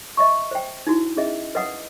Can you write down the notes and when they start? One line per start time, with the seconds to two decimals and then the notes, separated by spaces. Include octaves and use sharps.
0.17 D#5 E5 C#6
0.51 C5 G5
0.87 D#4 E4 F#4
1.17 C#4 G#4 D#5 E5
1.55 B4 D#5 F5 F#5 D#6